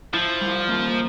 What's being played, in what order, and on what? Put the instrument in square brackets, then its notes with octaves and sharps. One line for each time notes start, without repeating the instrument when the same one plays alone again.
[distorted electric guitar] F3 [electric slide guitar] E4
[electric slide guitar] G3
A#3